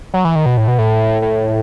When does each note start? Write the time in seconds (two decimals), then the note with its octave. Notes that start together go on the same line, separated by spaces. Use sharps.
0.14 F#3
0.25 E3
0.36 D#3
0.46 B2
0.57 A2
0.68 B2
0.78 A2
1.22 A2